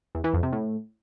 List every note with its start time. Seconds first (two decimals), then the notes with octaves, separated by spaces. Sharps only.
0.15 E2
0.24 E3
0.34 F2
0.43 C3
0.52 A2